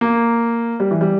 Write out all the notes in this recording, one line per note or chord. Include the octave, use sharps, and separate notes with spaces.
A#3
G3
E3
G3